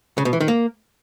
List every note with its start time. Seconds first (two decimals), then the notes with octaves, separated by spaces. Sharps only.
0.18 C#3
0.25 B2
0.33 E3
0.40 D#3
0.48 A#3